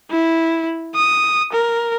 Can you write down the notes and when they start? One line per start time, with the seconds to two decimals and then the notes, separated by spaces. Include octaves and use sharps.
0.11 E4
0.95 D#6
1.52 A#4